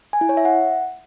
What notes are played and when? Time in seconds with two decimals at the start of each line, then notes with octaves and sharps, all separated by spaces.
0.13 G#5
0.21 E4
0.29 C#5
0.37 E5
0.45 F#5